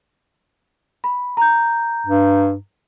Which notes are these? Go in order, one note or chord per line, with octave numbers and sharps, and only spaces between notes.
B5
A#5 G6
G2